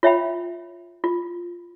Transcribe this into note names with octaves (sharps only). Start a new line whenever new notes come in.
F4 C#5 E5 F5 G5 B5
F4